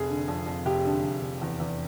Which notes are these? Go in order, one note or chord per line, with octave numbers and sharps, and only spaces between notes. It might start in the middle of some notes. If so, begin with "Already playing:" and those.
Already playing: F1 G#4
D3
F2
F2
F1 G4
D3
F1
F1
E2
E2